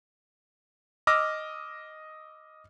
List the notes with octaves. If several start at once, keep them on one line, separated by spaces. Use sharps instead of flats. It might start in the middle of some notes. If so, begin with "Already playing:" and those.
D#5 D6 E6 F6 A#6